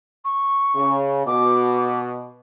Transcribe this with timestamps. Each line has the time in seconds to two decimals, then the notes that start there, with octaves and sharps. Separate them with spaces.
0.24 C#6
0.75 C#3
1.26 B2 D6